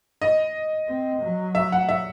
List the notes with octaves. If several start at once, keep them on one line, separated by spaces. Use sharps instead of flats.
D#5
C4
F#3
E5
F#5
E5